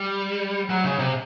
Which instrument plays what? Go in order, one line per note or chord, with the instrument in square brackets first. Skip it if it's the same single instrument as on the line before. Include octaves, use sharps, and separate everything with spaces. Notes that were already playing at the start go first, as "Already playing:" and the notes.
Already playing: [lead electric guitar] G3
F#3
C#3
C3